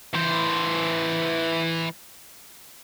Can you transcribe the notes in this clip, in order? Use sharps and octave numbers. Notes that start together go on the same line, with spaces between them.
E3 C5